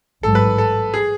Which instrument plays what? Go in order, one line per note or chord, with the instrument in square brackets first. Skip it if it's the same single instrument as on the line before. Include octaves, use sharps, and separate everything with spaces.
[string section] A1 G#2 F#3 [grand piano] A4
[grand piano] B4
A4
G#4